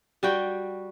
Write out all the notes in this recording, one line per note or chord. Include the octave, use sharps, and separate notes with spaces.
G3 F#4 G5